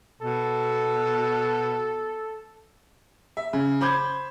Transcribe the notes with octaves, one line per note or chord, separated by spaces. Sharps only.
B2 A4
E5
C#3
C5 B5 D6 G6 G#6